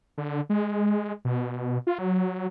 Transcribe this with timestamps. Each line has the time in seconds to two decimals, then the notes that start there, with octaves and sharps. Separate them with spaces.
0.18 D3
0.50 G#3
1.25 B2
1.87 F4
1.99 F#3